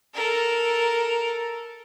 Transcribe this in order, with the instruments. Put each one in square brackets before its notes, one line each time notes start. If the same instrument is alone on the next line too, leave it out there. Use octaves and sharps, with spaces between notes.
[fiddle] A4 A#4